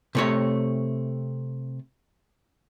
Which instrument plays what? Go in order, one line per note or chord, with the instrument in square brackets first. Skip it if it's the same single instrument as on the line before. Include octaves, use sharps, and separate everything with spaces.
[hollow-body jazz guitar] C3 A3 C#5